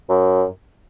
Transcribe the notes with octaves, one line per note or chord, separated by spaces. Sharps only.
F#2